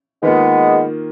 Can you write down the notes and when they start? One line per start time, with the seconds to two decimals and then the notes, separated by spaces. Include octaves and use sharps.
0.23 D#3 G#3 A#3 B3 F4